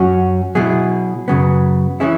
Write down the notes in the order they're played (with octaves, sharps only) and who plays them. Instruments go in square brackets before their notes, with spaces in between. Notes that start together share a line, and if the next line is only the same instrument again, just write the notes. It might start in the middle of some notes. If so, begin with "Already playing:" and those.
Already playing: [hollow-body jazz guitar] F#2 F#3 C#4 F#4
B2 F#3 E4 G#4
F#2 C#3 F#3 B3
E3 C#4 E4 G#4